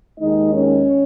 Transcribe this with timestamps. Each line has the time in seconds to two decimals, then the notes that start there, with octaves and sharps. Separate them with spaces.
0.19 D#2 D#3 G#3 D#4 D#5
0.53 C#4 C#5